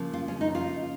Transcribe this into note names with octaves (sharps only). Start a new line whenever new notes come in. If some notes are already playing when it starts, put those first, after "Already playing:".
Already playing: C#3 F3 A#3
F4
C#4
D#4
F4